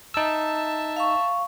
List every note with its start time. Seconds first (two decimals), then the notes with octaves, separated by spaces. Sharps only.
0.14 D#4 E5 A5 E6
0.96 F5 C#6